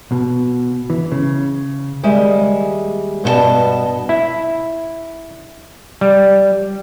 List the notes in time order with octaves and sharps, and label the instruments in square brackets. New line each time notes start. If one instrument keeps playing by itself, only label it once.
[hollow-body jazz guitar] B2
E3
C#3
[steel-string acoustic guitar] D#2 G3 G#3 E5
G2 B2 C5 D#5 A5
[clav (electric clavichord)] E4
G3